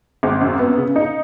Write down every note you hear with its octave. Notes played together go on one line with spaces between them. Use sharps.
G#1
F#2
B3
C#3
D#4